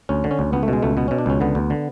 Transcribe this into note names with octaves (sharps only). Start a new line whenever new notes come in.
D2 C#4
D3
C#4
D2
C#2 B3
A3
B2
G#3
C#2 A3
B2 B3
B2 C#4
D4
C#2 C#4
D3 B3
D2
D3